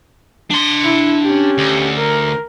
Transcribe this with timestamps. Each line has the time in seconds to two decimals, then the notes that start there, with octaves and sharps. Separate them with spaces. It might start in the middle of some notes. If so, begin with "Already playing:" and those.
0.50 D4 C6
0.83 E4
1.22 C#4 G4
1.58 D2
1.97 A#4